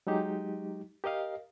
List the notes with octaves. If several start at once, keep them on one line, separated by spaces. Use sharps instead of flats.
F#3 G#3 D#4 G4
G4 A#4 D#5 F5